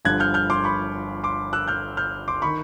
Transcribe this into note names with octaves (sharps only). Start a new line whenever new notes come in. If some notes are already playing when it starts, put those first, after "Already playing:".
G1 G2 D3 F3 F#6 G#6
F6 G6
F6 G6
C6 D6
B5 C#6
C6 D6
E6 F#6
F6 G6
F6 G6
C6 D6
D#3 B5 C#6